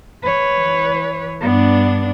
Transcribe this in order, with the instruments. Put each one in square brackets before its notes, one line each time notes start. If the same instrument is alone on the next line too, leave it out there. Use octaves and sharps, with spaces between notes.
[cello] B4 C#5
[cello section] E3
[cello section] G2 D4 [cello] B3